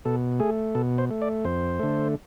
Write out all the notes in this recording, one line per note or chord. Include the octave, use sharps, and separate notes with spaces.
B2 A4
A3 G#4
B2 A4
C5
A3
D5
F2 C5
D3 A3